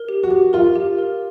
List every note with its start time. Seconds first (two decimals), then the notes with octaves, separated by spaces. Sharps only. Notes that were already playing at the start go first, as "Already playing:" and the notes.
Already playing: A#4
0.09 G4
0.23 F#4
0.31 G4
0.53 F4 A#4
0.75 G4
0.98 A#4